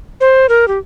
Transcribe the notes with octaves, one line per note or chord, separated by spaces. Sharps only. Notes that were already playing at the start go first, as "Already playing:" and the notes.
C5
A#4
G4